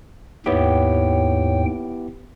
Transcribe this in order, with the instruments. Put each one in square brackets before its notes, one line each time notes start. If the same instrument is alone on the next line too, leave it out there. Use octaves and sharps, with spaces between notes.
[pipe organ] D#2 G#2 G5 [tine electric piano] B3 E4 G4 [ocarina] C#5